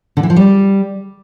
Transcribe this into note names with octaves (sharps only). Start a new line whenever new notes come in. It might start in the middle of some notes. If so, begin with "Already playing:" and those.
D3
E3
F3
G3